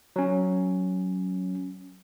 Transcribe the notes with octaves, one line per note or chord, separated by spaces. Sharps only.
F#3 C#4